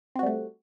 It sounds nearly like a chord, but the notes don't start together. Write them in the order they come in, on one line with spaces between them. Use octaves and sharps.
C4 F#4 G3 A3